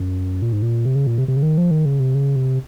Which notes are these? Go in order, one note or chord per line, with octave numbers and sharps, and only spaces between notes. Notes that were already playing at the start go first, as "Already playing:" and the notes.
Already playing: F#2
A#2
G#2
A#2
C3
C#3
A#2
C3
C3
C#3
D#3
F3
D#3
C#3
C3
C#3
C3